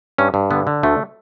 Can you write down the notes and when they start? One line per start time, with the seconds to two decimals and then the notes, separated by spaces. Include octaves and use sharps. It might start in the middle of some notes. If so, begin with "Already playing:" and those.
0.18 G2 C#4
0.34 G2
0.51 D3 B3
0.67 D3
0.83 D2 A3